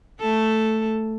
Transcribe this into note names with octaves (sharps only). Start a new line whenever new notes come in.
A3 A4